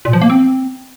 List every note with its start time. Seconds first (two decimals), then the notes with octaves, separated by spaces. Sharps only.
0.05 A#2
0.13 F3
0.21 A#3
0.30 C4